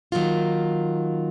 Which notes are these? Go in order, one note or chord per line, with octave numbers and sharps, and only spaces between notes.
D#3 F#3 A#3 F4